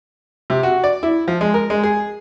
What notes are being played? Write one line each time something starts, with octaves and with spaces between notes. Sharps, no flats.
C3
F#4
D5
E4
F3
G#3
A#4
G#3
G#4